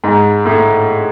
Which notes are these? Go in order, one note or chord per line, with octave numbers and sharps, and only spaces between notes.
G#2
A2